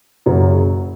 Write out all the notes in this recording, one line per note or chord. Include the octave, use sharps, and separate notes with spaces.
F#1 F#2 C#3 F#3